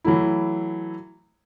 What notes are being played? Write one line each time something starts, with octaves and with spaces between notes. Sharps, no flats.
E3 F#3 A3 E4